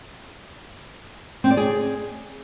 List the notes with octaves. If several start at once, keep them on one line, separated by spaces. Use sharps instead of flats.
C4
D5
G#4